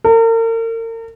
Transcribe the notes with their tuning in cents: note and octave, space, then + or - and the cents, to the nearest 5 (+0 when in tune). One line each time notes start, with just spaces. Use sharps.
A#4 -40